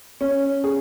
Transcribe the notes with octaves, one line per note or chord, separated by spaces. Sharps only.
C#4
G#4